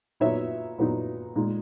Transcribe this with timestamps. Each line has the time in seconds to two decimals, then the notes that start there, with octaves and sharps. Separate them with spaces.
0.20 A#2 F#3 B3 D#4 C#5 E5
0.78 A#2 F#3 B3 D#4
1.35 A#2 G#3 D#4